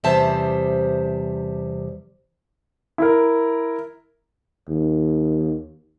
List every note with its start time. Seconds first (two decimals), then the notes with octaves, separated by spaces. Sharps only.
0.04 E2 C3 G3 C5 E5 A5
2.98 E4 A#4
4.69 D#2